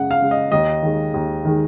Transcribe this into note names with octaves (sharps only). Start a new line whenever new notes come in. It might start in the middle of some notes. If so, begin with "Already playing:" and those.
Already playing: F#2 C#3 G#3 F#5
F5
C#3 G#3
D#5
D#2 D#5
D#3 G#3
D#2
D#3 G#3